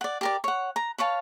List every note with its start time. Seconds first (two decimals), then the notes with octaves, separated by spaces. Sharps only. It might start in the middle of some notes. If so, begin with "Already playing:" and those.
0.01 D5 F#5
0.21 G4 A#4 D5
0.44 C#5 F#5
0.76 A#5
0.98 B4 C#5 F5 A5